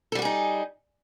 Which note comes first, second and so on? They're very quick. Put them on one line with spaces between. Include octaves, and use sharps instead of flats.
A4 G3 F#4 G#4 D#4